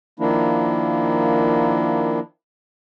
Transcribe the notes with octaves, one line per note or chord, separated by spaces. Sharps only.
D#3 F3 A#3 D4 E4